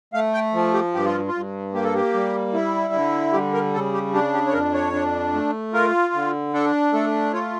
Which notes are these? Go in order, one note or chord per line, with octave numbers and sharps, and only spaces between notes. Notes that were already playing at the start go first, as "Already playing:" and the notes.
A3 F5
G5
F3
G4
G2 G4
F4
F4
G2
A#3 G4
A4
G4
G3
E4
D3
G3 G4
A#4
C#3 A4
G4
D4 G4
G4
C#5
F2 A#4
C#5
D4
A3
F4 A#4
D3
D4 A4
A3 A4
F4 C#5